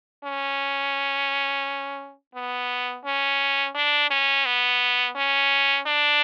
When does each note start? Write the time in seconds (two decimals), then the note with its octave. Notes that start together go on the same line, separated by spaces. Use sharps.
0.24 C#4
2.35 B3
3.05 C#4
3.75 D4
4.10 C#4
4.45 B3
5.16 C#4
5.86 D4